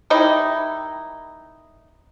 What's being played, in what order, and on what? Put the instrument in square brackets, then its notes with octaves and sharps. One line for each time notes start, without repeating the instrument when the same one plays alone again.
[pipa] D#3 G3 D#4 E4